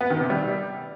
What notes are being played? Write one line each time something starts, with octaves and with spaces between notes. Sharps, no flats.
B3
D#3
C3
G3